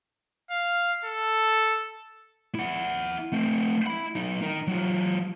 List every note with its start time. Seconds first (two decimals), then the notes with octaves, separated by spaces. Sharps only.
0.51 F5
1.05 A4
2.55 E4 F#5
3.32 A3 C4
3.87 E4 B5
4.15 F#3 D#4
4.42 D#4 A#4
4.67 F#3 F4